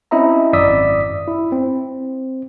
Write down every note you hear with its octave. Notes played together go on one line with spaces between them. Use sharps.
C4 C#4 E4 D#5 E5 A#5
G#1 F#2 D5 D#6 E6 B6
E4
C4